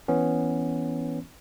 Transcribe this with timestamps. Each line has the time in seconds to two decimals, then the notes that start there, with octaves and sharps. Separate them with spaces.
0.08 E3 B3 C#4